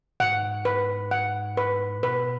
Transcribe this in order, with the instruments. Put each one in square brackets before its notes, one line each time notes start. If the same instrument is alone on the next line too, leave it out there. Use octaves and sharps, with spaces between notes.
[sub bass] G#2 [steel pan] F#5
[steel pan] B4
F#5
B4
[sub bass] A2
[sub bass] B2 [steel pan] B4